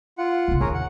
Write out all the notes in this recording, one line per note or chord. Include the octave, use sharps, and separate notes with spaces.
F4 F#5
E2 C3
D#2 G#4 A#4 C#5
F#5